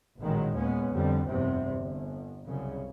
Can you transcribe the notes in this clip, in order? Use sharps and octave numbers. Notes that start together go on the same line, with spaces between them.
A1 A#2 D#3 F#3 G#3
D#2 A#2 G#3 B3 C#4
F2 D3 G3
F1 E2 G2 C3
G1
C2 F#2 C#3